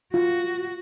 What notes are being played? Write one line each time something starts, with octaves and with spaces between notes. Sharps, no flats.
F4 F#4